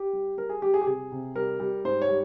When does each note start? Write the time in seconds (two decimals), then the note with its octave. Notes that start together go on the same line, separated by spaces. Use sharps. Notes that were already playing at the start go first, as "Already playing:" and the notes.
Already playing: G4
0.13 G3
0.37 G3 A#4
0.49 G#4
0.62 G3 G4
0.74 G#4
0.81 G4
0.86 C3 G#4
1.12 C3
1.35 G3 A#4
1.60 G3
1.85 G#2 C5
2.02 C#5
2.09 G3